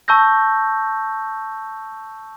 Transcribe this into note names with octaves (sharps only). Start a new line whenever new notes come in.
A5 C#6 E6 G6 A#6